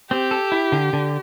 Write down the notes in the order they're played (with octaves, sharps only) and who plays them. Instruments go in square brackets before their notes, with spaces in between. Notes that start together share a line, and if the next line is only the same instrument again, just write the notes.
[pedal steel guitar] C4 [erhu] G4
[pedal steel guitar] A4
E4
D3
D3